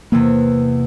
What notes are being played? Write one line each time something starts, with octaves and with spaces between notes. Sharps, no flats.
E2 C3 E3 A#3